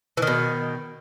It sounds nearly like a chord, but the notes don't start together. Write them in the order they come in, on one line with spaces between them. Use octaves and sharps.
E3 D#3 B2